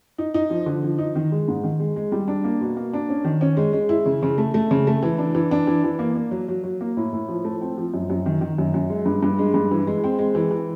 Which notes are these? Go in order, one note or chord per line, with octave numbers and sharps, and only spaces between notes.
D#4
D#4
F3
D3
F3
D#4
D#3
G#3
G#2
D#3
G#3
G#3
G3
D4
A#3
B2
A#3
D4
C#4
D#3
C#4
G#3
G#3
E4
C#3
C#3
A3
A3
C#3
A3
E3
D4
E3
D4
E3
E3
A#3
A#3
F#3
F#3
F#3
A#3
A2
A2
F3
A3
C4
F3
F#2
F#2
D#3
D#3
F#2
F#2
G#3
G2
G2
G#3
G2
E3
G#3
C4
G#3
E3
E3